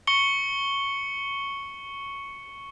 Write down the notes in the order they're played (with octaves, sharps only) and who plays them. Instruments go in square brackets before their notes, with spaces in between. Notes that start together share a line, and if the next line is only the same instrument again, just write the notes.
[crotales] C#6 C#7 G7